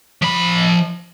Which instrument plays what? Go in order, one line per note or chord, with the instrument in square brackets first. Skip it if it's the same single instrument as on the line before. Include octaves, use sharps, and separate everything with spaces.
[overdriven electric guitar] F3 B5